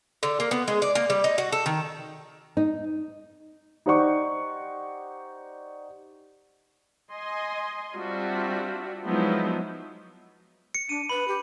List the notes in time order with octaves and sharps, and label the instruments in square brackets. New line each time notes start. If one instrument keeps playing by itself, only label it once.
[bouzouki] D3
A#3
B3
G#3
D5
A#3
G3
D#4
F#4
A4
D#3
[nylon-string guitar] D#4
[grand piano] D#4 G4 C5 D5 F#5 C#6
[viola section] D#5 G#5 C6
G3 C4 D4 F4 F#4 E5
F3 F#3 G#3 B3 D#4 E4
[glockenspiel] C#7
[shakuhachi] D4 [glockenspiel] D#7
[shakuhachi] B4 [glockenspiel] B5
[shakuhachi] G4